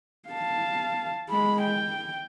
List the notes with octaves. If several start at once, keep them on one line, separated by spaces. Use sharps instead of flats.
F5 A5
G#3 B5
G5